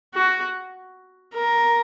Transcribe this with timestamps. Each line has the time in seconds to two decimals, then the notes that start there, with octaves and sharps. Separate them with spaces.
0.14 F#4
1.34 A#4